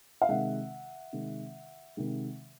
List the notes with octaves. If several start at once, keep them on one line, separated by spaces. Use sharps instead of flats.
F5
C3 D#3 G#3 E5 F#5
C3 D#3 G#3
C3 D#3 G#3